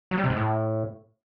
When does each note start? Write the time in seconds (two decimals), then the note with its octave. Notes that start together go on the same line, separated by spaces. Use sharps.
0.11 F#3
0.17 G3
0.24 C3
0.30 G#2
0.37 A2